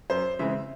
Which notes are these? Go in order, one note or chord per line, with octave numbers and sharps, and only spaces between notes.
F#2 C5
C#3 E3 G#3 C4 E5